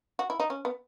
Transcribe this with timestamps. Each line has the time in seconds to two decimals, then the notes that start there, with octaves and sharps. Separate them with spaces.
0.19 F#4
0.30 E4
0.40 D#4
0.50 C#4
0.65 B3